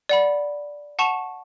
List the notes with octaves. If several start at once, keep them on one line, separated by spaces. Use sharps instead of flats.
D5 F#5 B5
F#5 A5 C#6 E7 F7